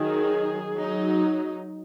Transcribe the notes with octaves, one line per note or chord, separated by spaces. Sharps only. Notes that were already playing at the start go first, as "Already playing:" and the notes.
Already playing: D#3 F#3 D#4 G#4
F#3 D#4